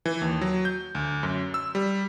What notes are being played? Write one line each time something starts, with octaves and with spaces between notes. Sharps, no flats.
E3
D#2
F#3
G6
D2
F#2
E6
G3